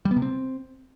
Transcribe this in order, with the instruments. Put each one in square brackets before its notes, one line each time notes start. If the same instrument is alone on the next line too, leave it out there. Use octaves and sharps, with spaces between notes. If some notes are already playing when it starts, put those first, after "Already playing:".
[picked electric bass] G3
B3
C3
C4